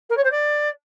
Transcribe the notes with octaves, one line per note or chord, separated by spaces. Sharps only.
A#4
C#5
C5
D5